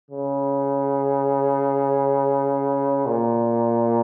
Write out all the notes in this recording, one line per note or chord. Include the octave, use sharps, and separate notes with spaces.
C#3
A#2